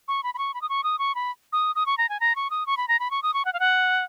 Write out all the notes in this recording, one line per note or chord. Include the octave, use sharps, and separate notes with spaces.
C#6
B5
B5
C#6
B5
D#6
C#6
D#6
C#6
B5
D#6
D#6
C#6
A#5
G#5
A#5
C#6
D#6
C#6
B5
A#5
B5
C#6
D#6
C#6
F#5
F5
F#5